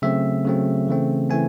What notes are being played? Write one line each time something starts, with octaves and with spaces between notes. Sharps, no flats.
C#3 F#3 A3 C4 E5
C#3 F#3 A3 C4
C#3 E3 A3 C4
E3 A3 C4 G#5